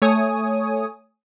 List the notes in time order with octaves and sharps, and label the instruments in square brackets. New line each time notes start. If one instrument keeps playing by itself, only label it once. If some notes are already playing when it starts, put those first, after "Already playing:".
[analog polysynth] A3 C#5 G#5 D#6